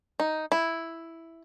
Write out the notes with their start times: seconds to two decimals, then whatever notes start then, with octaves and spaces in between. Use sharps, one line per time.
0.20 D#4
0.52 E4